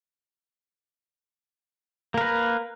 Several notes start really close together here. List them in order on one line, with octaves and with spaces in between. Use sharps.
A#3 A#4 B4